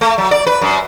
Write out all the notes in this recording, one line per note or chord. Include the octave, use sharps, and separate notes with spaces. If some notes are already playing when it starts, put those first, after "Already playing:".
A3
F#3
D5
B4
F#2